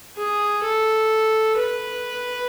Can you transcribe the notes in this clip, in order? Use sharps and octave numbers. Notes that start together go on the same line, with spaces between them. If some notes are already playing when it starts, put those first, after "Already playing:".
G#4
A4
B4